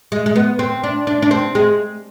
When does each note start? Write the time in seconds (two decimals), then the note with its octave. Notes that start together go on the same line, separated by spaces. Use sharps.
0.12 G#3
0.26 G#3
0.36 B3
0.59 C4
0.83 D4
1.07 D4
1.22 D4
1.31 C4
1.55 G#3